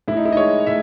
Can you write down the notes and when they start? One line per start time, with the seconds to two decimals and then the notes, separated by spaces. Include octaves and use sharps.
0.08 A2 E4
0.17 D#4
0.25 E4
0.32 D#5
0.37 G#3 C#5
0.67 A2 E5